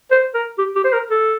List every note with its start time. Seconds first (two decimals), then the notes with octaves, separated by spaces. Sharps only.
0.11 C5
0.34 A#4
0.58 G4
0.76 G4
0.84 C5
0.93 A#4
1.10 A4